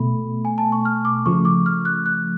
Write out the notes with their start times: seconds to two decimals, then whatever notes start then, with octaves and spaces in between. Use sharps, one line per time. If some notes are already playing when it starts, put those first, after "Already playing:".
Already playing: B2 A3 B5
0.45 G#5
0.58 A5
0.72 C#6
0.85 F6
1.05 D6
1.26 C#3 F3 A3 C#6
1.45 D6
1.66 F6
1.85 F#6
2.06 F#6